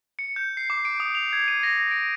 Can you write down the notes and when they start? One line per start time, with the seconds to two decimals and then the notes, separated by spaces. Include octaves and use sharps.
0.19 C#7
0.36 G6
0.57 C7
0.70 D6
0.85 D7
1.00 D#6
1.15 F7
1.33 G#6
1.48 D#7
1.63 A#6
1.91 D7